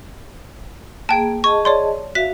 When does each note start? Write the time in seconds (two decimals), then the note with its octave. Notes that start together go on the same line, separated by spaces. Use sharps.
1.09 A#3 G#4 G5 A5
1.44 G#4 D#5 A5 C#6
1.65 C#5 D5 C6
2.15 F#4 E5 F5 B6